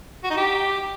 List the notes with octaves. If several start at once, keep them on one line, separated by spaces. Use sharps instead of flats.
F#4
D#4
G4